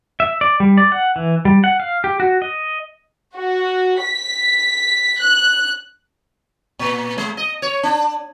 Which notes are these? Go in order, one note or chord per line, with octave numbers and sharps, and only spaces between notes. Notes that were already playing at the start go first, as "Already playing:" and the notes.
E5
D5
G3
D5
F#5
E3
G3
F#5
F5
G4
F#4
D#5
F#4
B6
F#6
A#2
G#3
D#5
C#5
D4